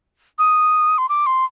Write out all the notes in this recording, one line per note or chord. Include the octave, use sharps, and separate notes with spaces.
D#6
C6
D6
C6